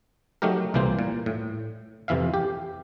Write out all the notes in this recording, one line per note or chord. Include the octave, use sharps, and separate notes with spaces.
F#3 A3 D#4 G4 A#4
C2 A#2 E3 A#3 C4 C5
A#2
A2
F2 C3 E3 E5 F5
G4